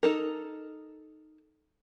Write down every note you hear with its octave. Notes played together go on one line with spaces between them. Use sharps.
D#4 A4 A#4